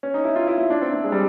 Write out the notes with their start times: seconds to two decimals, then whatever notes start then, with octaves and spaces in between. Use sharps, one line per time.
0.03 C#4
0.14 D#4
0.24 E4
0.36 F4
0.47 E4
0.58 E4
0.70 D4
0.82 C4
0.93 C4
1.04 G#3
1.12 G3